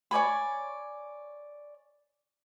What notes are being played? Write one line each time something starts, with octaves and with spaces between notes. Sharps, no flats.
C#5 D5 G#5 B5